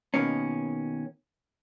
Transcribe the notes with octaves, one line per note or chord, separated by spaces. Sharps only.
B2 D#3 A#3 C#4